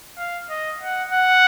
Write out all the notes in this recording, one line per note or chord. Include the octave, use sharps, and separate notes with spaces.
F5
D#5
F#5
F#5